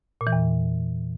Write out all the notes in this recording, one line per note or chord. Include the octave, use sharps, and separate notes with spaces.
A#2
E3
E2